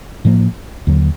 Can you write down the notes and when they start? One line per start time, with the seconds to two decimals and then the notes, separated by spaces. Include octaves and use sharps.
0.25 A2 F3 A#3
0.87 D#2 D3 F#3